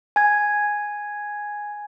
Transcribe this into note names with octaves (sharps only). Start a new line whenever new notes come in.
G#5 G#6